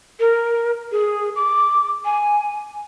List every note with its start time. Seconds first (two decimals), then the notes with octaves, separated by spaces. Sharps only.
0.20 A#4
0.92 G#4
1.36 D6
2.05 G#5